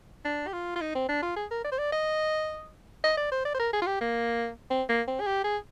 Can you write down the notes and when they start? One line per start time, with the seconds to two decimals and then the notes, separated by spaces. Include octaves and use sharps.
0.25 D4
0.47 G4
0.53 F4
0.76 F4
0.81 D#4
0.95 C4
1.09 D4
1.22 F4
1.36 G#4
1.51 A#4
1.64 D5
1.72 C5
1.78 D5
1.92 D#5
3.04 D#5
3.17 D5
3.32 C5
3.45 D5
3.54 C5
3.60 A#4
3.73 G#4
3.82 F4
3.86 G4
4.01 A#3
4.70 C4
4.89 A#3
5.07 C4
5.20 G#4
5.26 G4
5.44 G#4